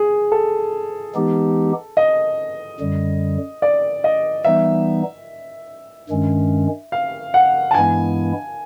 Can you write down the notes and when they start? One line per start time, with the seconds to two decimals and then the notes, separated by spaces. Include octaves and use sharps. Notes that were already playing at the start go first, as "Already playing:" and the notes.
Already playing: G#4
0.32 A4
1.15 E3 G#3 B3 D#4 G4
1.97 D#5
2.80 F#2 D3 G3
3.62 D5
4.04 D#5
4.45 E3 G3 B3 D#4 E5
6.10 G2 D#3 G#3 C#4
6.92 F5
7.34 F#5
7.71 A5
7.74 G2 E3 G#3 B3 E4 G#5